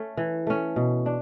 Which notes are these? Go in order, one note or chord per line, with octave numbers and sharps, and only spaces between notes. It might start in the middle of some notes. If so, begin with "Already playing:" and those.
Already playing: A3 C#4
E3
A3 C#4
B2
D4